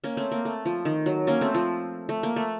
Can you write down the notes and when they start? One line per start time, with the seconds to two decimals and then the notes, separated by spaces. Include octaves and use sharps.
0.04 A#3 C#4
0.17 A3 C4
0.32 A#3
0.45 A3
0.65 F3
0.85 D#3
1.06 F#3
1.27 A#3 C#4
1.41 A3 C4
1.54 F3
2.09 A3
2.23 A#3
2.36 A3